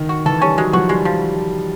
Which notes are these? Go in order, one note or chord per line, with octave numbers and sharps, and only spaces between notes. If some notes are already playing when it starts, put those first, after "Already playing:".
Already playing: D#3
F#4
E3 A4
G3 C#4
F#3 G#3
F3 F#4
G3 G#3
F3